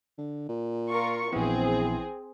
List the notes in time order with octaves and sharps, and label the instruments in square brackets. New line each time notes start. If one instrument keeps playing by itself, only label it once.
[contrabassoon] D3
A#2
[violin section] F4 A#4 C#6
[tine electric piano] A#1 B3 [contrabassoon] E3 [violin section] C4 G#4